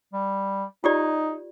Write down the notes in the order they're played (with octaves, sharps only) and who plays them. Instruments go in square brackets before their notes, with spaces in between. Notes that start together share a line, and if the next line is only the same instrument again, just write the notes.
[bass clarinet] G3
[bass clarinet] D#4 [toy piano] F4 G4 D5